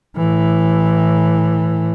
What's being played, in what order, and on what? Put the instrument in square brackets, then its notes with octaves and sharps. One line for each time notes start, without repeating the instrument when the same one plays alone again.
[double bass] A2 E3